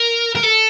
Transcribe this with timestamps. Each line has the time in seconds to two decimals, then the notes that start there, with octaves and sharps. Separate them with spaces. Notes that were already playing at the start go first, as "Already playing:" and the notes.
Already playing: A#4
0.35 A#4
0.43 A4